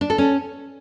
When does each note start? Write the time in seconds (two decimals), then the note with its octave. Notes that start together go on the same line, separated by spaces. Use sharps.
0.01 D4
0.10 A4
0.18 C#4